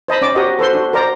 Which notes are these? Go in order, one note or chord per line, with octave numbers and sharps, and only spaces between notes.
C5 D#5 A5 B5
C#4 D5 D6
F#4 G4 A#4 C5 D5 D#5
A4 B4 C5 C6
D4 F#4
A#4 C5 D5 A#5